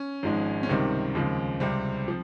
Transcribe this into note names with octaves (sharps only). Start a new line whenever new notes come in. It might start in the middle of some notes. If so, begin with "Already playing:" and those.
Already playing: C#4
G#1 G#2 F3 G#3
C#4
C#2 C3 D#3 G3 C4
D#2 C#3 F3 G#3
C#2 C3 G3 C4
F3